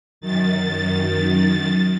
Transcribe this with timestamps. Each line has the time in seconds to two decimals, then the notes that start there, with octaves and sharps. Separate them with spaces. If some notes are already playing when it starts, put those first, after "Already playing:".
0.21 F#2 D#3 A6